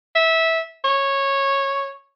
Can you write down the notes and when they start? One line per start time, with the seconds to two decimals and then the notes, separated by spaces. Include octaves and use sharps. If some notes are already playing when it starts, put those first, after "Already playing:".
0.16 E5
0.85 C#5